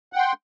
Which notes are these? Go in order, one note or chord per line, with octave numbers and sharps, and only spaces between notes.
F#5 G5 C6